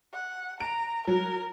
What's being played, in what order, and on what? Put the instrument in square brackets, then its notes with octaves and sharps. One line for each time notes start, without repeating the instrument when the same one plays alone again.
[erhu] F#5
[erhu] A#5 [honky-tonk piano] D7
[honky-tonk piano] F#3 [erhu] A#4